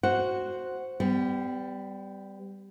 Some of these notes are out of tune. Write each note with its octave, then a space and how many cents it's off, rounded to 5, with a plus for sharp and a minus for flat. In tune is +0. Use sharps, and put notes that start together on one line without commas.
F#4 +0 C5 +0 F#5 +0
G3 +0 B3 +40